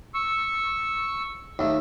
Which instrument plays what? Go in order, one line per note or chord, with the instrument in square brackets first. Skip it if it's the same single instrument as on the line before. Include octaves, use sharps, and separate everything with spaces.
[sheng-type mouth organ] C#6 E6
[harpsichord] D#2 A3